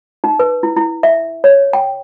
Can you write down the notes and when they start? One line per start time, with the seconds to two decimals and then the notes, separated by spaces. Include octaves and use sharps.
0.24 D#4
0.39 B4
0.63 E4
0.76 E4
1.03 E5
1.44 C#5
1.73 G5